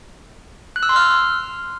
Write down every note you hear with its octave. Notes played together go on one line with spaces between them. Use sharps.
F#6
E6
C6
F6